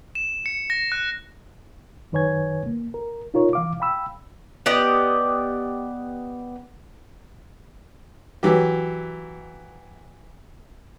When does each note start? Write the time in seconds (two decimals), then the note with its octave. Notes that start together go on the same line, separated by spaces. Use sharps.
0.15 E7
0.46 C#7
0.70 A#6
0.92 F#6
2.12 F#2 D#3 B4 C#5 G#5 G#6
2.66 A#3
2.94 A#4
3.34 D#4 F4 A#4 C#5
3.53 E3 F5 D6
3.80 F5 G5 B5 E6
4.66 B3 G4 D5 D#5
8.43 E3 F#3 G4